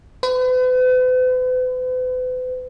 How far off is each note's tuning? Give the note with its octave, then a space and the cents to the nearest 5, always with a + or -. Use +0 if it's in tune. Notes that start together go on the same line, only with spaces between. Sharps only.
B4 +45